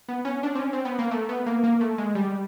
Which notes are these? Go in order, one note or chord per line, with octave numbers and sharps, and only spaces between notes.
B3
C#4
D4
C4
C#4
C4
B3
A#3
A3
B3
A#3
A#3
A3
G#3
G3